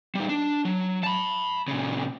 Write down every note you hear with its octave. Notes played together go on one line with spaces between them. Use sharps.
G3 D#4
D4
F#3
A5 B5
A#2 C#3